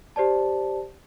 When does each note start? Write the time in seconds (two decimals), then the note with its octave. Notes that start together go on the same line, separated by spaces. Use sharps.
0.16 G4 C5 D5 A5